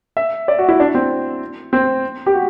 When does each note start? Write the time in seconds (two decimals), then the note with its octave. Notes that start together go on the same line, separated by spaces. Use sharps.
0.17 E5
0.48 D5
0.59 F#4
0.69 E4
0.80 D4
0.95 C4
1.73 C4
2.26 G4
2.34 F#4